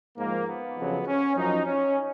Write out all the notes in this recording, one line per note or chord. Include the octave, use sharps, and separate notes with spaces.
G#2 F3 A#3
B3
F2 C#3 F#3
C#4
F#2 F3 D#4
C#4